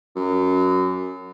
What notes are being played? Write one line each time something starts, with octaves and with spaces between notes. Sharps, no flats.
F#2